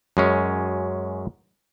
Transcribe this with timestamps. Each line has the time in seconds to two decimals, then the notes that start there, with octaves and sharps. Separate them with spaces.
0.17 F#2 G#3 C#4